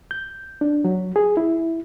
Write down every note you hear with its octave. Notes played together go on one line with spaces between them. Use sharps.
G6
D4
F#3
G#4
E4